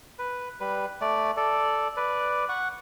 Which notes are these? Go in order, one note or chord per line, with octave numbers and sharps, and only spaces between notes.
B4
G3 B4
A3 D5
A4 D5
B4 D5
F#5 C#6